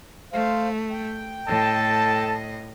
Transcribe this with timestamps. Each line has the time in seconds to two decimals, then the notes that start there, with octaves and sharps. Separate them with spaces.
0.33 A3 C5 F5
0.91 G5
1.48 A2 A4 D#5 A5